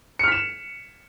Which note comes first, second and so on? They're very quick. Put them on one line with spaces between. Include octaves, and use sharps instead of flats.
C#7 F6 B6 E7